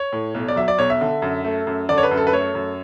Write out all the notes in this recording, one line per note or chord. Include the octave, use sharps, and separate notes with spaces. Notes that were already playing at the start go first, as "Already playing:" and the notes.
Already playing: C#5
A2
B1
D5
F#3 E5
D5
B1 C#5
E5
D3
F#2
A3
F#2
D3 D5
C#5
B4
F#2
A4
B4
A3 C#5
F#2